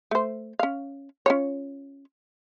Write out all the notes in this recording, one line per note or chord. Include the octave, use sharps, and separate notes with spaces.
A3 C5
C#4 F5
C#4 F4 C#5